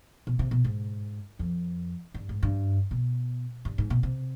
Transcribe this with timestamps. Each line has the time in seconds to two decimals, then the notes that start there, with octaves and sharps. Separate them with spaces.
0.27 B2
0.39 C3
0.51 B2
0.64 G#2
1.39 F2
2.14 G2
2.29 G#2
2.43 G2
2.91 B2
3.65 G2
3.78 G#2
3.90 B2
4.03 C3